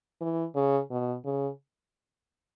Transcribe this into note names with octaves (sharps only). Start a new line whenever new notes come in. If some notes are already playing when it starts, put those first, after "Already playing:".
E3
C#3
B2
C#3